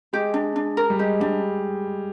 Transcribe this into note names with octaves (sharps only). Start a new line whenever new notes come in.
G#3 G4
D4
D4
A#4
G3
G#3 G4
G3 D4